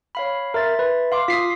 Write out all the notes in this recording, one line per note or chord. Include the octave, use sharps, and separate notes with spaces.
C#5 F5 B5
A#4 E5 C6 A6
B4
F5 C6 D6
F4 D#6 B6 C7